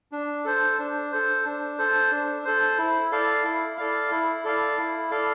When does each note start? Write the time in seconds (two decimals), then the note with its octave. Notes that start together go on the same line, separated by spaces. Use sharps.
0.12 D4
0.45 A4 C5
0.78 D4
1.12 A4 C5
1.45 D4
1.78 A4 C5
2.11 D4
2.45 A4 C5
2.78 E4
3.12 A4 D5 F5
3.44 E4
3.77 A4 D5 F5
4.11 E4
4.45 A4 D5 F5
4.78 E4
5.11 A4 D5 F5